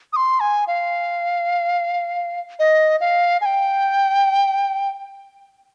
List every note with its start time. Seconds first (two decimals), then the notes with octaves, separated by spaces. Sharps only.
0.13 D#6
0.16 C6
0.40 G#5
0.67 F5
2.59 D#5
3.00 F5
3.41 G#5
3.45 G5